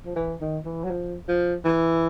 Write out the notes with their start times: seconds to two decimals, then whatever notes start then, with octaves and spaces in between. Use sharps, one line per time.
0.06 F3
0.16 E3
0.41 D#3
0.65 E3
0.84 F#3
0.90 F3
1.28 F3
1.65 E3